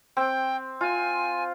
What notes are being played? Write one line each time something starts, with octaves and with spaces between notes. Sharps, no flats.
C4 G5
F4 G#5